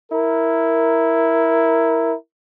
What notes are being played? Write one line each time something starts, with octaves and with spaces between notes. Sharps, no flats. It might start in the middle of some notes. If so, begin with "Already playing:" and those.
E4 A#4